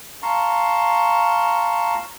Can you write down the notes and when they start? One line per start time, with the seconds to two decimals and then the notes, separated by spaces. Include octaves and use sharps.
0.22 F5 A5 A#5 C6 C#6